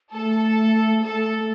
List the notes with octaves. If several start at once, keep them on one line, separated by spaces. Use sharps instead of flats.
A3 A4
A3 A4
A3